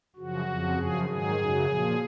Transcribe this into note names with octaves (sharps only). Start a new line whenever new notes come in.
F#2 C#3 F3 F#4
F2 C#3 F3
F#2 C#3 F3 G#4
G#2 D#3 F#3 G#4
F#2 C#3 F#3
A#2 F3